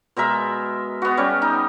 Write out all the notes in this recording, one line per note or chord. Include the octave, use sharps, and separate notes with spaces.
B2 G#3 A#4 E5
B3 F#4
G3 C#4
D#4